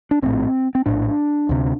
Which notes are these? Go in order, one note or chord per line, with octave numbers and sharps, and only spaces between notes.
D4
A#1 A2 C4
C4
A#1 A2 D4
D2 C3